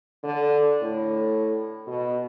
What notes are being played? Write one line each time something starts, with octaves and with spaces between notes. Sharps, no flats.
D3
A2
B2